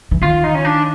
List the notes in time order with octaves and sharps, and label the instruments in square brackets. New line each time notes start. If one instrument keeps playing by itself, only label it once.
[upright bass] E3
[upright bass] D#3 [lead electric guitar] F4
[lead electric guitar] D#4
C#4
D4